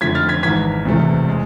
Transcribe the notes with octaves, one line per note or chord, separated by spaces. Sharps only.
F2 D3 A3 G#6 B6
F6 A6
G#6 B6
G#1 G#2 E3 G#6 B6
E1 E2 C3 E3 A3
G#3